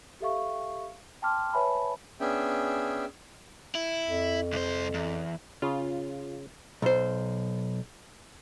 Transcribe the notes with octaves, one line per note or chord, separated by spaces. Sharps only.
G4 A4 E5 F5 C#6
G5 A5 C6 D6 F6
B4 C#5 E5 G#5 A5 B5
B3 C#4 D4 G#4 E5 G5
E4
F2
C2 C5
E2
C#3 F4
B1 C5